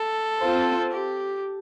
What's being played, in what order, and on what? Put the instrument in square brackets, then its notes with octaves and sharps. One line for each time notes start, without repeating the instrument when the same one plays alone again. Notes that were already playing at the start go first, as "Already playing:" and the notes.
Already playing: [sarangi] A4
[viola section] C4 F4 C5
[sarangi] G4